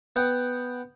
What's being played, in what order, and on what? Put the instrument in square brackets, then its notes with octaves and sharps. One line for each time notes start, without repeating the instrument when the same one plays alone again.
[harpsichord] B3 F#5 G5